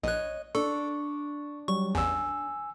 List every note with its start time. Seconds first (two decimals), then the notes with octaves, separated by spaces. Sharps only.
0.03 A#1 C#5 D#5 F#6
0.55 D4 A4 C#6
1.68 F#3 G3 C#6
1.95 A1 E2 G#5 E6